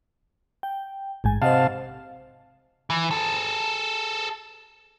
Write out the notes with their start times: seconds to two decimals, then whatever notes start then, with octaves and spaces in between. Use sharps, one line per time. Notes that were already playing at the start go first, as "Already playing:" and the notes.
0.63 G5
1.24 A1 G#2 G#5
1.42 C3 C5 D#5 F5 F#5 A5
2.90 E3
3.11 G#4 A4